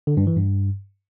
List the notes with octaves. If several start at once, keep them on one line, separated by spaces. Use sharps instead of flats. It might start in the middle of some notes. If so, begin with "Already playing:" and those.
D3
G2
E3
G2